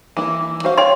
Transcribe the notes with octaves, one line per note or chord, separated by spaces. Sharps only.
E3 A#3 E4
F#4 C5 F5
C#5 F5 G5 C6